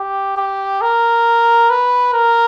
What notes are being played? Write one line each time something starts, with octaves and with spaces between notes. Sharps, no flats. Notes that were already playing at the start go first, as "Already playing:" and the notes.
Already playing: G4
G4
A#4
B4
A#4